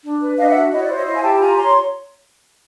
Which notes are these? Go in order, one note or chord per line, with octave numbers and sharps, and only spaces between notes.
D4
B4
D4 D#5 F5
E5 F#5
F#4
E4 C#5 D#5
D5
C5
C#5 D#5
E4 D#5 F5
G#5
G4 G5 A5
A5
F4 G#5 A#5
C#5 A#5 C6